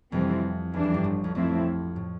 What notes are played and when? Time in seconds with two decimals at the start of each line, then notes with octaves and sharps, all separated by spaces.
0.12 F2 C3 E3 G3 C4
0.73 E2 E3 G3 D4
0.84 F2
0.94 G1 G2
1.04 A1 A2
1.24 F2
1.35 F2 F3 A3 C4 E4
1.96 A2